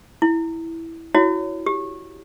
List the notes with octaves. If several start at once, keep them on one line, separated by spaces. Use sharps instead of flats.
E4
E4 F#4 C#5
G4